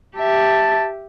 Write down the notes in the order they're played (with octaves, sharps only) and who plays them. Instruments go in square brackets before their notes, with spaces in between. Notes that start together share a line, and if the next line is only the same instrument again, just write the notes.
[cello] G4 E5 [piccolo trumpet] A5